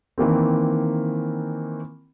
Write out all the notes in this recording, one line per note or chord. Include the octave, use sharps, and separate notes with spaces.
D#3 E3 A#3 C4